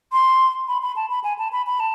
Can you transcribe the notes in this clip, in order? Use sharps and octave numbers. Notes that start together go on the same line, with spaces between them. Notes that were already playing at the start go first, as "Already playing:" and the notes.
C6
B5
B5
A5
B5
G#5
A5
B5
B5
A5